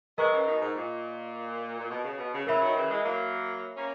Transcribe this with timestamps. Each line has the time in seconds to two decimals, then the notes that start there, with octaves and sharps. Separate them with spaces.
0.17 G#3 B3 A#4 D#5 A#5 C#6
0.32 C#3 E3
0.46 B2 D#3
0.61 G#2
0.75 A#2
1.78 A#2
1.90 B2
2.04 C#3
2.18 B2
2.33 C#3
2.47 C#3 E3 A#4 E5 B5
2.61 D#3 F#3
2.76 C#3 E3
2.90 E3 G#3
3.04 F#3 A#3
3.76 A#3 C#4